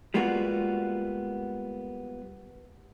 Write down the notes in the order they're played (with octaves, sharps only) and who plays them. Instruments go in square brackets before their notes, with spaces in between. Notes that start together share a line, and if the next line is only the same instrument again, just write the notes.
[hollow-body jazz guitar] G3 G#3 A#3 B3 F4 F#4